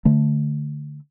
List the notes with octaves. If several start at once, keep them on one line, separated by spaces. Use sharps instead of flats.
D3 A3